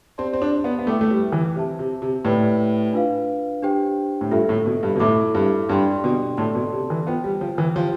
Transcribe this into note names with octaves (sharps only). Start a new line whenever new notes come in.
C4 G4 D5 A5 C6
C4
D4
B3
B3
A3 E4 B4 E5 G5 D6
A3
G3
E3
C3 C5 E5 A5
C3
C3
A2 G4 B4 D5 G5 B5
D4 F4 B4 F5
D4 G4 C5 G5
A2
G2 F4 A4 E5
A2
B2
G2
B2
A2 E4 A4 E5 B5 D6
G2
G2 D4 G4 D5 G5 C6
B2
A2 A4 D5 A5 C6
B2
C3
E3
B3 F4 C5 G5
G3
F3
E3
F3 G4 C5 G5 C6